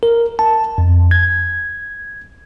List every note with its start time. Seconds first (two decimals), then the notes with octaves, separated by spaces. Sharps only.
0.03 A#4
0.39 A5
0.78 F2
1.11 G#6